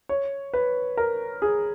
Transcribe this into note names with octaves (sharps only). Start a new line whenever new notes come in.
C#5
B4
A#4
G#4